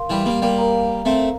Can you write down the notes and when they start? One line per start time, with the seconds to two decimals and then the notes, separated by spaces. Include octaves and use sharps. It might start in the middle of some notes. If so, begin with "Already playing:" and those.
Already playing: A#4 F5 C6
0.10 E3 G3
0.26 G3 A#3
0.42 G3 A#3
0.58 A#4 F5 A#5
1.05 A3 C4